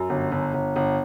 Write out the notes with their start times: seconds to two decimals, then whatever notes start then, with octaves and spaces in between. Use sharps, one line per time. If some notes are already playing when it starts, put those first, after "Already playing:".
Already playing: F#2
0.09 G1
0.32 G1
0.54 G1
0.76 G1